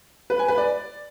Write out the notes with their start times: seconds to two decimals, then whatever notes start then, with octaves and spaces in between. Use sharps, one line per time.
0.30 B4
0.39 G#5
0.48 B4
0.58 D5